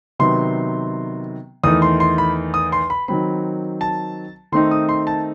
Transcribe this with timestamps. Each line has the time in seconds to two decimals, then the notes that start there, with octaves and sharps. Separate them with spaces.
0.19 C3 D#3 F#3 B3 C6
1.64 E2 D#3 A3 D#4 D#6
1.82 C6
2.00 C6
2.18 B5
2.54 D#6
2.72 C6
2.90 B5
3.08 D#3 F#3 C4 B5
3.81 A5
4.52 D#3 A3 C4 D#4 C6
4.71 D#6
4.89 C6
5.07 A5